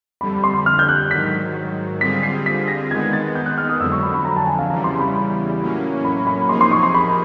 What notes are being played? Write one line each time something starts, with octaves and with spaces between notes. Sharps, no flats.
F2 D3 G3 B5
C6
F6
G6
F#6
G#2 D#3 F#3 B6
D3 G3 C4 F4 G#4 B6
C7
B6
A#6
D#3 G#3 B3 G#6
A6
G6
F#6
F6
D#6
F2 D3 F#3 E6
C#6
B5
B5
A#5
A5
G#5
F5
E2 C#3 E3 G3 A#5
C6
B5
A2 F#3 A#3 C#4
B5
B5
C3 F3 A#3 D#4 G#4 C6
C6
C#6
C6
B5